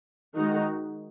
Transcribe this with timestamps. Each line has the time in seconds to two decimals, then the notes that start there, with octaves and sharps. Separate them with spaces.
0.36 D#3 G#3 D#4 F#4